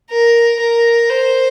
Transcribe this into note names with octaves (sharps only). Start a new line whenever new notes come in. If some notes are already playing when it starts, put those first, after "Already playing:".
A#4
A#4
C5